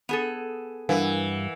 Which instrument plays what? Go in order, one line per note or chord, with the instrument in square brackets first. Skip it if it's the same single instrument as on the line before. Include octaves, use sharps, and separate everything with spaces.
[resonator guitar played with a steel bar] B3 G#4 A4
[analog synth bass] G2 [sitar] E3 [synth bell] A#4 F5 F#5